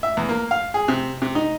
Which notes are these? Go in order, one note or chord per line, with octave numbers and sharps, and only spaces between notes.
E5
E2
A#3
F5
G#4
C3
C3
D#4